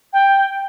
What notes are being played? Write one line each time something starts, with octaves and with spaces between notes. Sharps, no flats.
G5